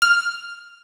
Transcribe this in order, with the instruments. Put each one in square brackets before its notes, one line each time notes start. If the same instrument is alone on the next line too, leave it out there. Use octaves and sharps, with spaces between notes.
[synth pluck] F6